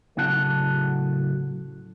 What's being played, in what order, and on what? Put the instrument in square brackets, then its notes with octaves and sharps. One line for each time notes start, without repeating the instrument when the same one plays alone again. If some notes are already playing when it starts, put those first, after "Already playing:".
[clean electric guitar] A2 C#3 F#3 F#5 A5